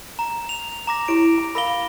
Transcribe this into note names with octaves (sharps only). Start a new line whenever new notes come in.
A#5
F7
A#5 D6 A#6
E4 G4 C#5 D7
A#5
A#4 F5 B5 A#6 G7